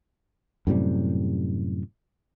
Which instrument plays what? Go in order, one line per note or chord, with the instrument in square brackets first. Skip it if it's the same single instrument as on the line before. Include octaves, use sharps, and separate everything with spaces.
[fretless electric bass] F#2 A2 C3 G3